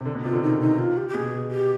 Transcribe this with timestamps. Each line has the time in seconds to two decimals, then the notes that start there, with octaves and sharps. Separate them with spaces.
0.01 C3
0.06 D3
0.15 B2
0.24 C3 F4
0.33 D3
0.42 D#3 D#4
0.60 C3 D#4
0.78 F4
0.97 G4
1.08 G4
1.14 B2 G#4
1.51 G4